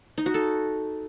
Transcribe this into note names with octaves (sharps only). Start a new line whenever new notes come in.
D#4
F#4
A4